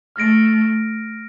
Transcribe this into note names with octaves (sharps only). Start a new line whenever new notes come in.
A3 F6 A#6 D7